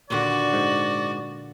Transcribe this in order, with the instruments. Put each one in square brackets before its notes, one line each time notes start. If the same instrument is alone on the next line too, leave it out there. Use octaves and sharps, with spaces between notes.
[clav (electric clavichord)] D#2 [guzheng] A#2 D3 [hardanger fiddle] F#4 [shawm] D5
[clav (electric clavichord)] G#2